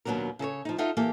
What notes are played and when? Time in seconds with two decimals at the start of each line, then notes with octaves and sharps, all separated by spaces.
0.05 D#2 B2 D#3 F#3 D4 A#4
0.39 C#3 A4 A#4 C#5
0.65 F3 D#4
0.78 D#4 F4 A4 E5 F#5
0.97 E3 A#3 G4 A4